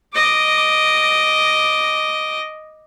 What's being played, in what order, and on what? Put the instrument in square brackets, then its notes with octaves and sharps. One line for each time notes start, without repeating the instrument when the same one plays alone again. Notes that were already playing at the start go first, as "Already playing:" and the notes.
[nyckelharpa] D#5 D6